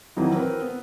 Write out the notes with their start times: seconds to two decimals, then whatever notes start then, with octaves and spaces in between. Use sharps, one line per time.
0.17 F2 D#3 E3 F#3
0.34 C4 A#4 B4
0.61 B3